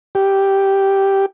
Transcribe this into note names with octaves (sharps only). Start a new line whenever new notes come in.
G4